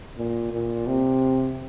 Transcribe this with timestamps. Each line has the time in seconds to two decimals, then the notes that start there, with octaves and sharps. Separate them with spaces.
0.17 A#2
0.52 A#2
0.87 C3